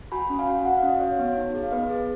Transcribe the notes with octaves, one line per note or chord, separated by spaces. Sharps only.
F#4 G#5 B5
C#4
F5 G#5
F#4
F#4 F#5
F5
C#4
D#5
F#4 C#5 F5
B3 C#5
D#4
G#4
F5
B3 B4 D#5
G#4